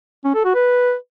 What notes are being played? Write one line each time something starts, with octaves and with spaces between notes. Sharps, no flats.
C#4
A4
F#4
B4